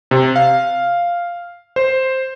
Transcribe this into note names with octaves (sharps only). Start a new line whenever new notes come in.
C3
F5
C5